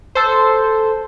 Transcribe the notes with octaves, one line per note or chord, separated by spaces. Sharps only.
A4 C5